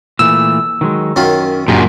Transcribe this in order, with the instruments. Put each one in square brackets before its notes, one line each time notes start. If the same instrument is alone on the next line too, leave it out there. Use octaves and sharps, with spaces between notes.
[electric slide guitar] A#2 E3 A3 [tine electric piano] E6
[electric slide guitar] D#3 F#3 G#3
[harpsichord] F#2 D#3 F4 [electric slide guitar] C#4
[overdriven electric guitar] F#2 A#2 [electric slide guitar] D4 G4 G#4